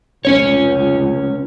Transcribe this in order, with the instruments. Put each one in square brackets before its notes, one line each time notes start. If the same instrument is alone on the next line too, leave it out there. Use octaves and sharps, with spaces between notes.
[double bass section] F1 C#2 [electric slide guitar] C#4 C#5